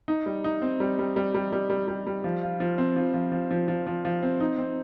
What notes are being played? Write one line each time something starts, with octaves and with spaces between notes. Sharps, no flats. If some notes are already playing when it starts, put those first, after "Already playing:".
D#4
G3
D#4
C4
G3
G3
G3
G3
G3
G3
G3
G3
F3
F4
F3
C4
F3
F3
F3
F3
F3
F3
F3
C4
D#4
C4